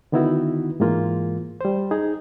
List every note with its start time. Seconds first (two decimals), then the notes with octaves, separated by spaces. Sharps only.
0.12 D3 D#3 B3 D#4 E4 F#4
0.80 G#2 E3 G#3 A#3 F4
1.61 G3 C5
1.91 D#4 G#4